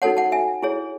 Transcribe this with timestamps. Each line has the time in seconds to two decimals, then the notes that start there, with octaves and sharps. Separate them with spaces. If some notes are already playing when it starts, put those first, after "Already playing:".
0.02 D#4 F#4 A4 C#5 F#5 A5
0.17 F#5 A5
0.32 E5 G#5
0.62 E4 G#4 C#5